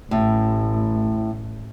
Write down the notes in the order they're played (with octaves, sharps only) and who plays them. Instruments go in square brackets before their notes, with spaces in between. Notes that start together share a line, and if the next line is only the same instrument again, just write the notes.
[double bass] A1 [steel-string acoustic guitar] A2